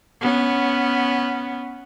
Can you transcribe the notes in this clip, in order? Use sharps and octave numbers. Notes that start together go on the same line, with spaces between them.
B3 C#4